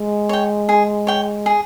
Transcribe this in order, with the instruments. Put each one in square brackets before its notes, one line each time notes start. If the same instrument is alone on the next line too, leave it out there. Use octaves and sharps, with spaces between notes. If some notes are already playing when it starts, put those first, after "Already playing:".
Already playing: [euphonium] G#3
[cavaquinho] C#5 G5
G#4
C#5 G5
G#4